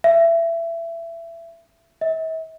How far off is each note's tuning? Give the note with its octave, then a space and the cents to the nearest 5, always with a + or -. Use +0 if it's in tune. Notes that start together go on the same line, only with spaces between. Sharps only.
E5 +20
E5 -40